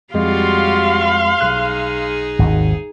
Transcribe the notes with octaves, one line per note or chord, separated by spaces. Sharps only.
F2 G3 G#3 F4 F#4 F5 C6
B1 D#4 G#4 F#6
G#1 D#2